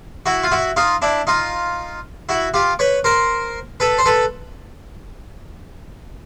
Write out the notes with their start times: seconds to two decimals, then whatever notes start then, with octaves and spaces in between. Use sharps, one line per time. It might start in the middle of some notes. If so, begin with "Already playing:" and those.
0.26 E4 F#4
0.43 F4
0.52 E4 F#4
0.76 D#4 F4
1.02 D4 E4
1.27 D#4 F4
2.29 E4 F#4
2.54 F4 G4
2.79 B4 C#5
3.04 A#4 C5
3.80 A4 B4
3.98 C5
4.06 A4 B4